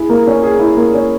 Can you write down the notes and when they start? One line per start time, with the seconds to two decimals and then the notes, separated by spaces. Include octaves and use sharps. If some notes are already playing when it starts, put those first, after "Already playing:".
Already playing: E4 G#4
0.10 A#3
0.27 C#4
0.43 G#4
0.60 E4
0.77 A#3
0.94 C#4